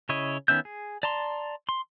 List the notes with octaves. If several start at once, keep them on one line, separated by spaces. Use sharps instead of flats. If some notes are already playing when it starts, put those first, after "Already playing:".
C#3 E4 C#5 D#5
D#3 B3 C#4 E5 G6
G#4
D5 A5 A#5 C6
C6